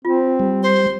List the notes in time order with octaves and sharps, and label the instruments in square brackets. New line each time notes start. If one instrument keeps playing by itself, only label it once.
[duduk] C4 [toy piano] F4
[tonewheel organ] G3
[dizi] C5